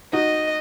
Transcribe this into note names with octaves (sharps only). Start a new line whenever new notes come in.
D#4 F#4 D#5